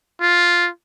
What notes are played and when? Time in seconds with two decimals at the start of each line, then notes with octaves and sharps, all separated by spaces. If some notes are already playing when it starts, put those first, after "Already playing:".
0.21 F4